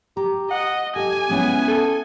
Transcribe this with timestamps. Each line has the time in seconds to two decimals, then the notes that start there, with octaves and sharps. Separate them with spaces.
0.17 G4 A#5
0.51 D#5 F#5
0.96 G4 A4 D#5 G#5
1.29 G#3 B3 C#4 E4
1.68 A4